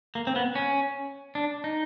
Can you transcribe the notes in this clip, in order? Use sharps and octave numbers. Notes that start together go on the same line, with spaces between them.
A#3
C4
B3
C#4
D4
D#4